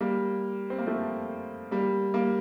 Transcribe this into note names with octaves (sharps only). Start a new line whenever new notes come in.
G3 A#3
C4
A#3
F3 A3
G3 A#3
G3 A#3